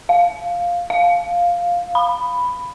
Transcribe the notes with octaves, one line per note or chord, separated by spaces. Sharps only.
F5
F5
B5